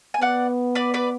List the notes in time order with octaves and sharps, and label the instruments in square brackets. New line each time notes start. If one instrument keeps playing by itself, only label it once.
[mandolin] G#5
[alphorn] B3 [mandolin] D5 F#5
[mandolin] B4 D5
B4 D5